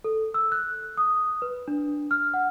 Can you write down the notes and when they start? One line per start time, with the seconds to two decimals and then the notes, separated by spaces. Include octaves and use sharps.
0.04 A4
0.34 E6
0.52 F#6
0.97 D#6
1.42 B4
1.68 D4
2.11 F6
2.34 F#5